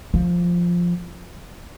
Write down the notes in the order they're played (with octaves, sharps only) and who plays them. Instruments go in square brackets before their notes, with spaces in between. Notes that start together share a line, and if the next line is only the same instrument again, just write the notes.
[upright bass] F3